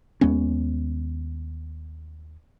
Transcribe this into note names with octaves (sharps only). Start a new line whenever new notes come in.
D#2 G#3 B3 C#4